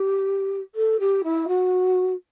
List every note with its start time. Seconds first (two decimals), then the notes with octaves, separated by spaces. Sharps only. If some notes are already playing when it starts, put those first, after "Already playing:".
Already playing: G4
0.75 A4
0.99 G4
1.23 E4
1.47 F#4